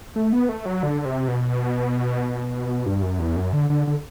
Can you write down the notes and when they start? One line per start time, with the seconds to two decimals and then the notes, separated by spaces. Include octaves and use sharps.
0.16 A3
0.33 B3
0.49 A3
0.66 F#3
0.83 D3
1.05 C3
1.28 B2
2.86 G2
3.02 F#2
3.19 E2
3.36 F#2
3.53 D3
3.70 D3
3.87 D3